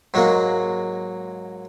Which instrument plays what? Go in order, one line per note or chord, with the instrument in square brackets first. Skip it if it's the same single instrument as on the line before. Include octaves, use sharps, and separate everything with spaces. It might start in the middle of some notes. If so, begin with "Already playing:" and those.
[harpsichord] G#2 F#3 G#3 A#3